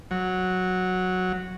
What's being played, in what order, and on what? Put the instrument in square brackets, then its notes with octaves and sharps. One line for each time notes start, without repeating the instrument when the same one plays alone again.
[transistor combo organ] F#3